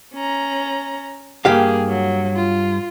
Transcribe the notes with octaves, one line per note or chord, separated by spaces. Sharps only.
C#4 A#5
G2 A#3 G4 G#4 F5
F#3
F4